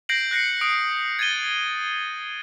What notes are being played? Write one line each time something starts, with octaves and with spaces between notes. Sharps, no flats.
G6 A#6 C7 D7 F#7
F#6 A#6 C7 C#7
D#6 D7
G#6 A6 D#7 G7